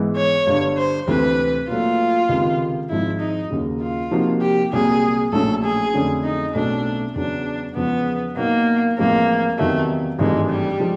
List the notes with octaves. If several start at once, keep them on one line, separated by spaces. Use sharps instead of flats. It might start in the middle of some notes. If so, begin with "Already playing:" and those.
Already playing: G#2 E3 G#3 B3
C#5
G1 G2 D3
C5
D2 C3 E3 A3 C4 B4
A#2 F#3 A3 F4
C#2 C3 D#3
G#1 G#2 F3 E4
D#4
D#2 C#3 F#3
F4
C3 F3 A#3 D#4 F#4
G4
C2 A#2 F#3 G#4
A#1 A2 F#3 A3 C#4 A4
G#4
F2 D3 F#3 A3 C#4
D#4
B1 A2 F#3 A3 C4 D4
E2 C#3 F#3 D4
E2 C#3 F3 G#3 B3
A#2 F#3 A#3 B3 D#4 F#4
A1 A2 F3 G#3 A#3 C4
E2 C3 D#3 F#3 A3
G#1 G2 E3 G#3 A3
G3
F3 G#3